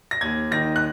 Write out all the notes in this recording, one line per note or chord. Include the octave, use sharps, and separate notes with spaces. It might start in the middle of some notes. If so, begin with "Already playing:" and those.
A#6
D#2 G#6
D#3 A#6
F#6